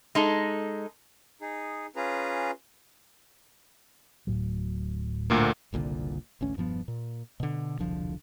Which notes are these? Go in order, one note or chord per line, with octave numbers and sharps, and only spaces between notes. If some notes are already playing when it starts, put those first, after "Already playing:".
G#3 D#4 A4
D#4 G#4
C#4 F4 G#4 B4 A#5
D1 A2 F#3
D2 A#2 A#3
F#1 C2 A#2 D3
A1 D2 C#4
E1 G2 F3 B3
A#2
B2 D3
E1 C2 D3 F3